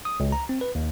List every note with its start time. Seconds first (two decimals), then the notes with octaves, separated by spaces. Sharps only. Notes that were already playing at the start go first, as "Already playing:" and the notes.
0.05 D#6
0.20 C#2
0.32 A#5
0.49 C4
0.61 B4
0.75 D#2